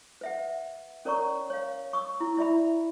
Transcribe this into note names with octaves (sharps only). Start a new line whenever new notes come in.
B4 E5 F#5
C#4 A#4 C#5 D5 A#5 C#6
C#5 F5
C#6 E6
E4
E4 D5 E5 B5